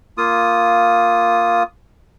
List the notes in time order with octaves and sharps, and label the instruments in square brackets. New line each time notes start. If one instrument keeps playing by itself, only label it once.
[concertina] A#3 F4 D#6